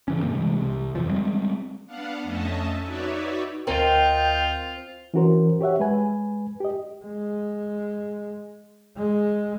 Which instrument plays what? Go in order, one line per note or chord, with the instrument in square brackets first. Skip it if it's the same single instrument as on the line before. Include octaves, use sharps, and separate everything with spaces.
[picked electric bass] C3 E3 C#4
G2 D3 A#3 C4
C3 E3 G3 G#3
C2
F2 E3 F3
G3 G#3 C4
[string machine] B3 D4 F5 F#5
F2 A3 C#4 D#5 E5 A5
D#4 F#4 B4 C#5 D5 E5
[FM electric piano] D2 A#4 [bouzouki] C4 [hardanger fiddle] F4 [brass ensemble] D#5 G5
[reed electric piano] E3 C#4 F#4 A#4 C5
G4 C#5 E5 F#5
G#3 B4 G#5
G4 D#5
[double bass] G#3
G#3